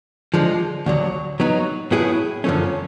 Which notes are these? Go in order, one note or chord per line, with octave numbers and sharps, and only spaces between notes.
D3 F3 G#3
D2 D3 F#3
F#3 B3 D#4
A2 F#3 B3 E4 G#4
F#2 D3 F3 A3 C#4